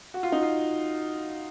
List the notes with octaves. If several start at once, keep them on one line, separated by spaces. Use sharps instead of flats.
F#4
F4
D#4
F4